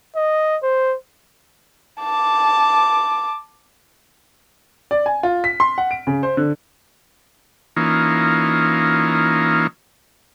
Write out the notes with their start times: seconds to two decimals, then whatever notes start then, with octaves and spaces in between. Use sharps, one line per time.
0.16 D#5
0.63 C5
2.01 A5 D6
4.91 D5
5.06 G#5
5.23 F4
5.44 B6
5.60 C6
5.78 F#5
5.91 D7
6.07 C#3
6.23 C5
6.37 D3
7.77 E3 A#3 C#4 D#4 F4